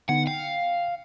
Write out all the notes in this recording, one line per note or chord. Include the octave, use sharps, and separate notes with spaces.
D3 B3 D#4 F#5
F5 G5